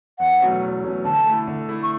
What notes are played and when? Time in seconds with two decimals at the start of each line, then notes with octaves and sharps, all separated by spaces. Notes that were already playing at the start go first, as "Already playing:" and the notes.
0.19 E2 F#5
0.40 B2 F#3 A3 C#4
0.62 E2
0.84 B2 F#3 A3 C#4
1.05 D3 A5
1.26 A3 E4
1.47 D3
1.69 A3 E4
1.83 C#6